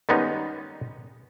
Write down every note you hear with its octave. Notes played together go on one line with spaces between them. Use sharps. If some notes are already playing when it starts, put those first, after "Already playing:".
D#3 G3 G#3 B3 C#4 D#4